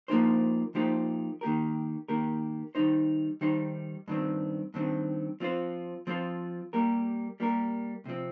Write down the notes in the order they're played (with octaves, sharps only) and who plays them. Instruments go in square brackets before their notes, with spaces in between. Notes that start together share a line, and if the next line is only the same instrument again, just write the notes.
[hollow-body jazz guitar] F3 A#3 D#4 G4 C5
F3 A#3 D#4 G4 C5
D#3 A#3 G4 A#4
D#3 A#3 G4 A#4
D#3 G3 D#4 C5
D#3 G3 D#4 C5
G2 D#3 C4
G2 D#3 C4
F3 C4 F4 C5
F3 C4 F4 C5
G3 A#3 G4 A#4
G3 A#3 G4 A#4
C3 F3 C4